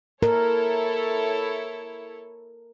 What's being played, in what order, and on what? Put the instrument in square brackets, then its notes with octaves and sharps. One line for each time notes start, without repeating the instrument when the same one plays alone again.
[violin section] E4 A4 C#5 [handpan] A#4